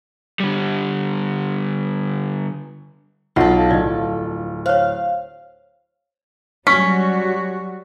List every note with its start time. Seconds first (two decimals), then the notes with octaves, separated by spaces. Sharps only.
0.40 D3 G3
3.36 B1 F3 F4 A4 D#5 F#5
3.71 D1 D5 D#5
4.66 C5 C#5 F5
6.67 F#3 G3 C#4 F#4 C#6 B6